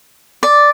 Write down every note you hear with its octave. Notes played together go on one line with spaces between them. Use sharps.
D5